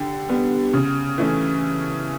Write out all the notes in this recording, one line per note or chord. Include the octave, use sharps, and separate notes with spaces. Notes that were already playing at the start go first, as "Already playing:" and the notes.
Already playing: D3 G4
G3 B3
C#3
E3 A3 C#4